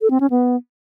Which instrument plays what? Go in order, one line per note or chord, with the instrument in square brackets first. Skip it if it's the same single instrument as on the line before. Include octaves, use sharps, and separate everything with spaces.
[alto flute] A4
C4
C#4
B3